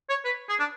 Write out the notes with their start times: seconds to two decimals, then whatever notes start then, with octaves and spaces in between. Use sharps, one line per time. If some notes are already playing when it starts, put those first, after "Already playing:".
0.09 C#5
0.25 B4
0.49 G#4
0.60 D4